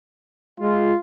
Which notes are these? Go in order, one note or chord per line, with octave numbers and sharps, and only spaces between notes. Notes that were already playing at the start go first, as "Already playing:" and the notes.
G#3 F4